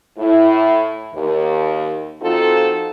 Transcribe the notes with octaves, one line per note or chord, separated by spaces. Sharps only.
A2 E4
D#2
F3 C4 D#4 F4 F#4 A4